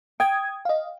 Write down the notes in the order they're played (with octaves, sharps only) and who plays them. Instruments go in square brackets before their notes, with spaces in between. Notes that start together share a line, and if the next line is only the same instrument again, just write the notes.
[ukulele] G5 [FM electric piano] D#6 G#6
[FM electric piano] D#5 F5